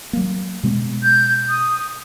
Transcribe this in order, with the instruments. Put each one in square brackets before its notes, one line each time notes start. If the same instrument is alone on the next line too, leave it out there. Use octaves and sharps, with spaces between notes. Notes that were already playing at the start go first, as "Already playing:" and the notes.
[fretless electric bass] F#3 A#3
B2 G#3 B3
[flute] G6
D#6